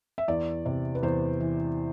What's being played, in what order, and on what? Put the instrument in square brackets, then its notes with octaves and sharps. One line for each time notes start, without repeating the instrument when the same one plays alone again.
[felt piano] E5
E2 D5
C3
B4
E2 C5
E3